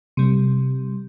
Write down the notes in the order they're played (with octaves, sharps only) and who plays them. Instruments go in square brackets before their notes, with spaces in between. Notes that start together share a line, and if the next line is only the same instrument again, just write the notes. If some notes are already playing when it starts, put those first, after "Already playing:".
[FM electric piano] C3 G3